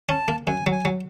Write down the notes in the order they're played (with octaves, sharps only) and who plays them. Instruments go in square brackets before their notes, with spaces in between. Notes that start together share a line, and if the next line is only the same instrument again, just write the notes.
[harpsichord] C#4 [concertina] A5
[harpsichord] A#3
[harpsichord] F#2 [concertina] G#5
[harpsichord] F#3
[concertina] G#5
[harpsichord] F#3